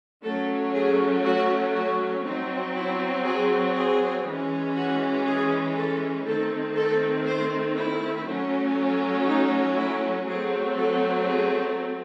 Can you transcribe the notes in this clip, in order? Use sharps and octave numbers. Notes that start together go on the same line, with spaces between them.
F#3 A3 C#4 A4
G#4
F#4
F#4
F#3 C4 D#4
E4
G#4
G#4
E3 G#3 C#4
F#4
G#4
A4
D#3 A3 C4 A4
A4
C5
E4
F#3 A3 C#4
D#4
E4
F#3 A3 C4 G#4
A4
G#4